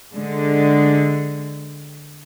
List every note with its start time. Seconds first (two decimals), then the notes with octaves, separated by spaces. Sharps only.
0.13 D3 G#3